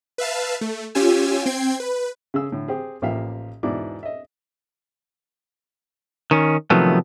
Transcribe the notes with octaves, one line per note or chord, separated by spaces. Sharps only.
B4 E5 F5 A5
A3
C#4 F4 G4 G#5 E6
C4 G5 G#6 C7
B4
C#3 G#4 E6
A2 D3
C4 G4 G#4
A1 F3 A#3 G4 E5 F5
E2 G#2 B2 D4 E4 D6
D#5 E5
D#3 C#4
C3 D#3 F3 F#3 A3 B3